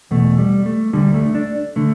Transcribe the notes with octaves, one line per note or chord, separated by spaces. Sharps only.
E2 B2 A3
G3
A3
D2 D3 G3
A3
D4
D3 A3